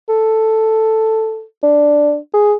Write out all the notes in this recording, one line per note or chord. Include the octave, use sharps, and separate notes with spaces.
A4
D4
G#4